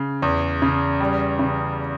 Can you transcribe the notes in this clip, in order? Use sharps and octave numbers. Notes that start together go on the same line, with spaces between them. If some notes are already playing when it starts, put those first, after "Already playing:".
Already playing: C#3
E2
C#3
G3
C#3